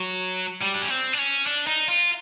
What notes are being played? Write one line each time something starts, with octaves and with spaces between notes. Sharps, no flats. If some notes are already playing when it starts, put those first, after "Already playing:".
Already playing: F#3
G3
D4
C#4
C4
D4
C#4
D4
D#4
F4